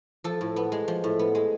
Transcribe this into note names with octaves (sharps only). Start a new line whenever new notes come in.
F3 A4
A2
B3
G#3
F3
A2
B3
G#3